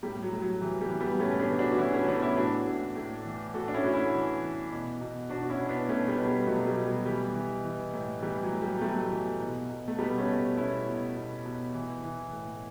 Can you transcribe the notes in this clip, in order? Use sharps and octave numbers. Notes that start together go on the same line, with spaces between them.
A2 G3
F#3
A2
F#3
E3 G3
G3
E3
G3 B3
A2 A3 C#4
C#4
B3 D4
E3
D4 F#4
F#4
E3 C#4 E4
A3 C#4
E3 B3 D4
C#4 E4
A2 D4 F#4
A2
A2
E3
A2 F#4 A4
D4
C#4 E4
A2 F#4
C#4 E4
E3
E3
B2
B2
B2 D4 F#4
F#4
C#4 E4
B2
B3 D4
B2 A3 C#4
G3 B3
B2
G3
B2 F#3 A3
G3
B2
F#3
E3 G3
E3
E3
A2
E3 G3
F#3
A2
G3
G3
A2 F#3 A3
E3
B2
B2
A3
B2 G3 B3
A3 C#4
B2
B2 C#4 E4
B2
B2
B2
E3
E3
A2